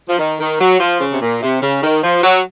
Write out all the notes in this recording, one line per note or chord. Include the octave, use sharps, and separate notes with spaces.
F3
D#3
D#3
F#3
F3
C#3
C3
A#2
C3
C#3
D#3
F3
F#3